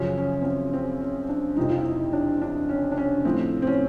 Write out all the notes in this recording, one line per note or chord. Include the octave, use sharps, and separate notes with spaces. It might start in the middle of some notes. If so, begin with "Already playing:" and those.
Already playing: F#2 C#3 F3 C#4
C#4
C4
C#4
C4
C#4
D4
F2 C3 F3 D#4
F4
E4
D#4
D4
D4
C#4
D4
C#4
A2 F3 C4
C4
C#4